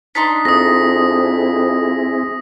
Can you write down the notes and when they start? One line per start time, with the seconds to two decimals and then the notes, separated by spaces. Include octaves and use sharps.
0.15 D4 D#4 C6 B6
0.45 F2 C4 E4 G#4 D#6 A#6